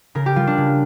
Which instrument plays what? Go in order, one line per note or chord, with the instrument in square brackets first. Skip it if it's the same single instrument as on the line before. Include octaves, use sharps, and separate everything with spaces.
[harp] C#3 A#4
G4
G3 F4
D4
C#3